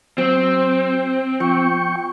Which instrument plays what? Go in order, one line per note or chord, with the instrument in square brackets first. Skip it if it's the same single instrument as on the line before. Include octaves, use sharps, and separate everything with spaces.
[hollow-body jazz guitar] F#3 [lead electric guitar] C4
[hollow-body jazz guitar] F3 [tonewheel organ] G5 C#6